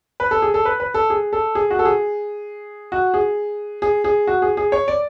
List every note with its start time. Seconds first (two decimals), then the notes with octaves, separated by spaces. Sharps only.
0.20 B4
0.31 A4
0.42 G#4
0.54 A4
0.65 B4
0.80 B4
0.94 A4
1.10 G#4
1.33 A4
1.55 G#4
1.71 F#4
1.79 A4
1.85 G#4
2.92 F#4
3.14 G#4
3.82 G#4
4.04 G#4
4.27 F#4
4.42 G#4
4.57 G#4
4.72 C#5
4.88 D5